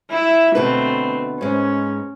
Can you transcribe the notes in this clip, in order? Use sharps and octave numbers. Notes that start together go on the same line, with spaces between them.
E4 E5
D2 B2 A3 C4 B4
G#2 G#3 C#4